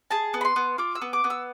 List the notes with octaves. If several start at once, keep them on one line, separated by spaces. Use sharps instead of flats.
G#4 A5
B3
B5
C6
B3
F4 D6
E6
B3
D6
B3
E6